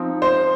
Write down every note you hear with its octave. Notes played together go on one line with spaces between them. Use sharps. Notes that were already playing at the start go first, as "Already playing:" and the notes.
Already playing: F3 C4 D#4
C5